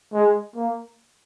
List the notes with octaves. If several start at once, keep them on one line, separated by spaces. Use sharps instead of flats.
G#3
A#3